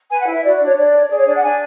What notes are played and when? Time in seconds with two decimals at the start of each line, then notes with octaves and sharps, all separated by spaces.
0.10 B4 G#5
0.21 F#5
0.27 E4
0.32 E5
0.44 F#4 D5
0.55 D5
0.60 D4
0.66 C#5
0.77 D4 D5
0.94 C#5
1.10 G#4 D5
1.18 C#5
1.26 D4 D5
1.34 F#5
1.43 D4 G#5